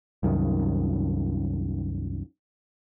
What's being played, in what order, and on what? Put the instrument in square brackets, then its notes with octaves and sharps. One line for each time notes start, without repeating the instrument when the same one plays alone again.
[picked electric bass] C2 F#2 D#3